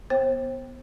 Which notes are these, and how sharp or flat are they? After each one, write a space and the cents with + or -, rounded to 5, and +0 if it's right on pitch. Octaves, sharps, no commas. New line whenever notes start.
B3 +0 C5 +35 G5 +0